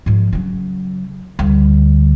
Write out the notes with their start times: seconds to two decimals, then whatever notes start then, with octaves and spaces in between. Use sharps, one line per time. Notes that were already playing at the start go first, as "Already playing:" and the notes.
0.06 G#2 F3
0.33 C#3 F#3
1.39 D2 G3